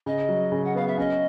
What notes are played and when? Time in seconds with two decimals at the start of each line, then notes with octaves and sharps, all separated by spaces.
0.06 C#3 D#5
0.29 F#3
0.52 C#3
0.64 F#5
0.75 B3 F5
0.87 E5
0.98 C#4 D#5